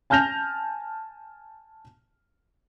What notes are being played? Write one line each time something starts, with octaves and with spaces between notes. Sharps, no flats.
G#5 A5 F6 G6 A#6 F7